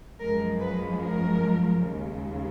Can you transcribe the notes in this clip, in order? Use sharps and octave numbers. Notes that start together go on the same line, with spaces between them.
F#2 F3 G#3 A#4
B4
A#4
D#2 C#3 G#3